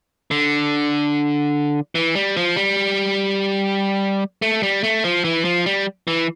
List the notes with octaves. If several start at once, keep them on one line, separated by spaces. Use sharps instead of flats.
D3
E3
G3
F3
G3
A3
G3
A3
F3
E3
F3
G3
E3